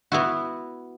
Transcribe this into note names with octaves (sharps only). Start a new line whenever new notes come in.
B3 E4 F#4